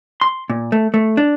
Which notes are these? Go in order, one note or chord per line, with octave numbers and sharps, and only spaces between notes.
C6
A#2
A3
A3
D4